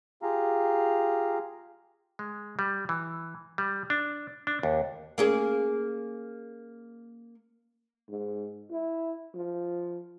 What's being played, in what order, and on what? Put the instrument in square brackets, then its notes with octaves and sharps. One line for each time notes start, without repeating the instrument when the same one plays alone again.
[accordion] F4 G4 G#4 F5 A#5
[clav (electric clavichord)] G#3
G3
E3
G3
D4
D4
D#2
[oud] A#3 C#4 G#4
[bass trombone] G#2
E4
F3